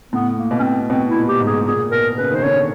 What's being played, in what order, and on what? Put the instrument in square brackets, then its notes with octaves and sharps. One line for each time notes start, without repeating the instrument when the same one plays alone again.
[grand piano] A2 [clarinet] B3
[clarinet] A#3
[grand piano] B2
[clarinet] C#4
C4
[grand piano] B2 [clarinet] C4
[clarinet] E4
[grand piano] A#2
[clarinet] G4
[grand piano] G#2
[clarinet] G#4
[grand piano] A#2 [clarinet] G#4
[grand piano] B2 [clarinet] A#4
[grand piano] C#3 [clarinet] B4
[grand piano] D#3 [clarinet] C5
[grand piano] D3 [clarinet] C#5